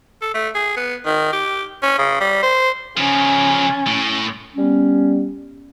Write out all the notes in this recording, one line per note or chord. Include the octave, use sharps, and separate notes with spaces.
A4
A3
G#4
B3
D#3
G4
C#4
C#3
G3
C5
C#3 F3 C#4
A2
G3 B3 C#4